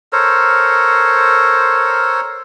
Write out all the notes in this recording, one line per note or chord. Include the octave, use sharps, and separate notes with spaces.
A4 A#4 C5 C#5